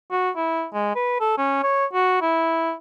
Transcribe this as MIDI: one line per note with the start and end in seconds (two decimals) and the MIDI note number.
0.11 0.30 66
0.36 0.65 64
0.73 0.92 56
0.95 1.15 71
1.20 1.34 69
1.38 1.59 61
1.63 1.86 73
1.93 2.20 66
2.21 2.73 64